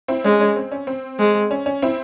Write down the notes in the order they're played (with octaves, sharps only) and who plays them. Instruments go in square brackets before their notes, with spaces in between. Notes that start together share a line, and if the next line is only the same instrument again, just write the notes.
[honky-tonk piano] C4 E4
[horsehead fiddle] G#3 [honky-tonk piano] C#4
[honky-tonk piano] C#4
C4
C#4
C4
[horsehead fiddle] G#3
[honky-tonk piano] C#4
C#4
C4 E4